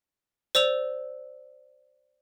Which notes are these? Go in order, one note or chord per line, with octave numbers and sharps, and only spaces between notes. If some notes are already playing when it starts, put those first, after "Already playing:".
C5 D5 E6 F7